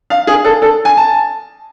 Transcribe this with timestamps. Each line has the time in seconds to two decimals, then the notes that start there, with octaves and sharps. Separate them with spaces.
0.10 F5
0.27 G#4
0.45 A4
0.62 A4
0.85 G#5
0.97 A5